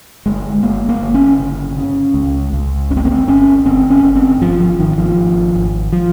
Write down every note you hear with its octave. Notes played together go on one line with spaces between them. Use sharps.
G1 G#3
G1 A#3
A#3
G1
C#4
C#3
C#3
C#2
C#2
G1 C#4
C4
A#3
C4
G1 C#4
G1 C4
C#4
G1
C4
G#1 F3
F3
G#1 D#3
F3
G#1
G#1
F3